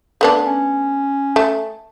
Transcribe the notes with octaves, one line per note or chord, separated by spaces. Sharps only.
A3 B3 D4
C#4
A3